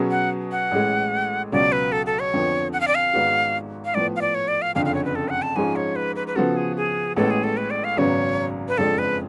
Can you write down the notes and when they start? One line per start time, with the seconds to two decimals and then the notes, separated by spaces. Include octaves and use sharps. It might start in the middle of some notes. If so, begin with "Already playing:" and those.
Already playing: B2 F#3 C#4 G#4 B4
0.11 F#5
0.52 F#5
0.71 A1 A2 G#3
1.52 C#2 B2 F#3 C#4 D5
1.72 B4
1.92 A4
2.06 A4
2.19 C#5
2.33 F2 D3 F3 B3
2.73 F#5
2.81 F5
2.88 D5
2.96 F5
3.14 G#1 G#2 G#3 B3 F#4
3.85 F5
3.94 A2 F3 B3 D5
4.16 F5
4.21 D5
4.35 C#5
4.48 D5
4.62 F5
4.75 F#1 F2 D3 F5
4.85 F5
4.95 C#5
5.05 B4
5.15 A4
5.29 F#5
5.42 A5
5.56 G#2 F3 G#3 C#4 G#5
5.76 C#5
5.96 B4
6.16 B4
6.27 B4
6.36 C#3 F3 B3 F#4 A4
6.56 G#4
6.76 G#4
7.17 A1 A2 G#3 B3 A4
7.30 G#4
7.44 A4
7.57 B4
7.70 D5
7.84 F5
7.97 G#1 F#2 C#3 F#3 B3 C#5
8.68 B4
8.78 F#1 F2 F3 G#3 D4 A4
8.98 B4